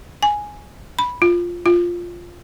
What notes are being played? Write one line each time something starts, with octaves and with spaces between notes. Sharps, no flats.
G#5
B5
F4
F4